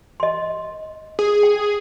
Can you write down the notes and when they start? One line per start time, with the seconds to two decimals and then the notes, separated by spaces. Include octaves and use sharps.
0.20 D#5 C6
1.19 G#4
1.43 G5